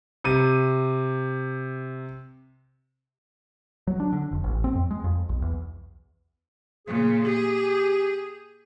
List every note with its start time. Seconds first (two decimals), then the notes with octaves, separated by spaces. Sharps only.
0.24 C3 D#7
3.87 F#3
4.00 D4
4.13 D3
4.31 F1
4.44 A1
4.64 C4
4.75 F2
4.91 G#3
5.04 F2
5.29 B1
5.42 E2
6.87 A#2 C#3 G#4
7.25 G4 G#4